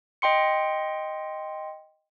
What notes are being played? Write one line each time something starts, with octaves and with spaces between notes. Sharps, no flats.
D#5 G5 C6 C#7